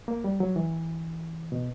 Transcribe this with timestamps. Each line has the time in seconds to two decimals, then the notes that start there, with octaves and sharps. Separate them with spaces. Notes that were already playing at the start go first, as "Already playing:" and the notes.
0.08 A#3
0.24 G3
0.40 F#3
0.56 E3
1.52 B2